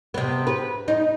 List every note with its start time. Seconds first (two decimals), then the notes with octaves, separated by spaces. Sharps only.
0.14 C3 B3
0.47 B4
0.88 D#4